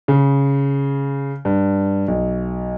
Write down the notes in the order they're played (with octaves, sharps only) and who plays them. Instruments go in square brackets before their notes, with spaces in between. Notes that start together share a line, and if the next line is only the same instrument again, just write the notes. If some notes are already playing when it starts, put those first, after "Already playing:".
[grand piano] C#3
G2
B1